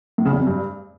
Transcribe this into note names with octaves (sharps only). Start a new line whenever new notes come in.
A2
C#3
E2
F2
G2